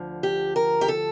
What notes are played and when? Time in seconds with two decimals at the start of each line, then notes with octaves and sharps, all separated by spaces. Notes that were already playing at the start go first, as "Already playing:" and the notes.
Already playing: D2 D3 F3
0.23 G4
0.56 A#4
0.81 G4
0.88 A4